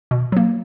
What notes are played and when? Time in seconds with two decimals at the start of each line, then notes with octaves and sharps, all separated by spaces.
0.11 B2
0.32 F#3 A#3